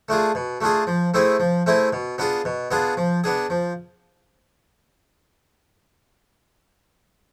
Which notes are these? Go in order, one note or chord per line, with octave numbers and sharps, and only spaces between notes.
A3 D4 F4 G#4
B2
A3 D4 F4 G#4
F3
A3 C4 E4 G#4
F3
A3 C4 E4 G#4
B2
B3 D4 F4 G#4
B2
B3 D4 F4 G#4
F3
B3 D4 G#4
F3